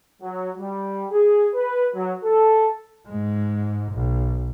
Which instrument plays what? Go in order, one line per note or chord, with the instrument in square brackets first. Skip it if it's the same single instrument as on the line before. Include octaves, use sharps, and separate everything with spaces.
[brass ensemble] F#3
G3
G#4
B4
F#3
A4
[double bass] G#2 G#3
B1